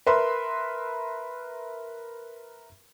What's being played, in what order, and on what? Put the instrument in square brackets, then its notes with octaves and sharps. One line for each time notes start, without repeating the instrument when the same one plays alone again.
[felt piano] A#4 B4 E5 B5 C6